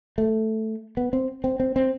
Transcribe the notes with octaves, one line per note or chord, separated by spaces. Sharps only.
A3
B3
C4
C4
C4
C4